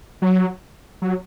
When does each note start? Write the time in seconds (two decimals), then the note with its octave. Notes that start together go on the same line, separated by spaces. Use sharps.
0.22 F#3
1.02 F#3